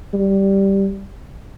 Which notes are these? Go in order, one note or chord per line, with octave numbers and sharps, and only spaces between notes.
G3